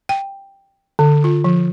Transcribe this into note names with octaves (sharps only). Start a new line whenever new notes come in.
G5
D3
F4
F3